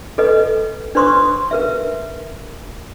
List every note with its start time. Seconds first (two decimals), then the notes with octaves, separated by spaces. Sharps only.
0.18 A4 B4 D#5
0.95 D4 B4 C5 C6 C#6 D#6
1.51 A#4 B4 E5